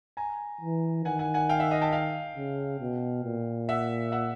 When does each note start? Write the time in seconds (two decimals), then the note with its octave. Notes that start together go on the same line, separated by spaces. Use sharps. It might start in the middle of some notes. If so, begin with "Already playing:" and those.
0.17 G#5 A#5
0.61 E3
1.05 D#3 F#5 G#5
1.19 F#5 G#5
1.34 F#5 G#5
1.49 F5 G5
1.60 E5 F#5
1.71 D#5 F5
1.81 G5 A5
1.92 F5 G5
2.36 C#3
2.80 B2
3.24 A#2
3.69 E5 F#5
4.12 E5 F#5